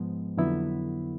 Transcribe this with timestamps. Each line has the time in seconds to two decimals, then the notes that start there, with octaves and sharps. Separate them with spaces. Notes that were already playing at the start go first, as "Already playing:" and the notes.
Already playing: G#2 F3 G#3 B3
0.37 F2 D3 F#3 B3 E4